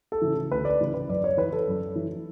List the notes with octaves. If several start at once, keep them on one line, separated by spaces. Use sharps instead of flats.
A4
C#3 E3
D2 B4
D5
C#3 E3
B4
F#2 D5
C#5
E3 B4
A4
F#2
E3